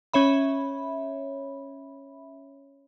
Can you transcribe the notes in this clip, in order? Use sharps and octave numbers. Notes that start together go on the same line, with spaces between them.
C#4 C#5 E5 B5